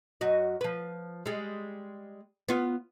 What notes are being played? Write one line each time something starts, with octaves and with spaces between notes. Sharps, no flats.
F#2 F#4 D#5
F3 B4
G3 G#3
B3 F4